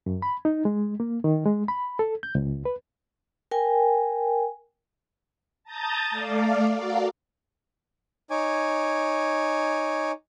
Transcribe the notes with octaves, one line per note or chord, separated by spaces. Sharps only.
F#2
B5
D#4
G#3
A#3
D#3
G#3
B5
A4
G6
C#2
B4
A#4 G5 G#5
A5 A#5 D#6 G6 A6
A3 D5 F5
F#4 A4 A#4 D5 F5
D#4 C#5 G#5 D6